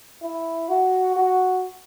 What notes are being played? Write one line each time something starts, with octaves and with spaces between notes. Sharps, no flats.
E4
F#4
F#4